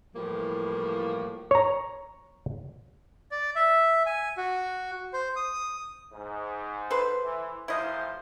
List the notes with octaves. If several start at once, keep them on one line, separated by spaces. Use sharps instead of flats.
A2 E3 F3 G3 A#3
C#5 A#5
D5
E5
G#5
F#4
C5
D#6
G#2
A4 B4 C5
E3
A1 F3 E4 C5 D#5 F#5